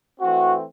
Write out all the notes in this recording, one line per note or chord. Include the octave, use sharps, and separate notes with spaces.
E3 A3 C4 F#4